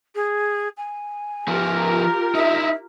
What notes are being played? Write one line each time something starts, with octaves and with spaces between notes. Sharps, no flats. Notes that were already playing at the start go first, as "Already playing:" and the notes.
G#4
G#5
F3 B3 F4 G4 A#4
D#4 E4 E5